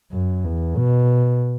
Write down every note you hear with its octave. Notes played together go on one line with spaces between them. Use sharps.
F#2
E2
B2